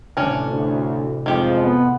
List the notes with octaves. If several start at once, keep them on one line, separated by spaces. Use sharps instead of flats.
A1 C3 C#4 D4
D2
F2 D#3 F3 G#3 G4
B3